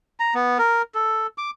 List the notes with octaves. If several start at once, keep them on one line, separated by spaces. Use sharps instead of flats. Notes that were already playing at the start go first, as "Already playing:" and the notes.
A#5
B3
A#4
A4
D6